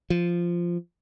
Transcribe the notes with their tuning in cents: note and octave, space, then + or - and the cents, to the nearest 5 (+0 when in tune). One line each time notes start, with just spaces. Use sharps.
F3 -10